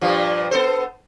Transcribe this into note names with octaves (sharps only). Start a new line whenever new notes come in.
G2 A#2 F3
B3 A4 C5